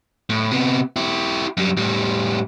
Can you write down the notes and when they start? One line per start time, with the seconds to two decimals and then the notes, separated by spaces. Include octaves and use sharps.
0.30 A2
0.51 C3 B3
0.96 E4 G4
1.57 F#2 G3
1.77 A2 G3